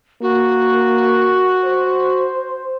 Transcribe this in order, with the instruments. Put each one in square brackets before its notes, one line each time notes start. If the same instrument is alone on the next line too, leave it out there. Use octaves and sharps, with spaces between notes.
[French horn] A#3 [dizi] F#4
[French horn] C5